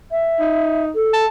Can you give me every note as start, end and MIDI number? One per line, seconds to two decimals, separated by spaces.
0.11 0.84 76
0.40 0.92 63
0.95 1.25 69
1.13 1.29 81